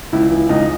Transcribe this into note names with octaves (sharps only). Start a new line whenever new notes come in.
C#2 E4
E3
C#2 D#4